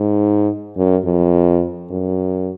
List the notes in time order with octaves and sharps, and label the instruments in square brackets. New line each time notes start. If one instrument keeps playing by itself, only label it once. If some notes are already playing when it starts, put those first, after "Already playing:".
Already playing: [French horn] G#2
F#2
F2
F#2